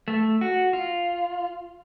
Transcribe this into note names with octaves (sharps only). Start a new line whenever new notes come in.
A3
F#4
F4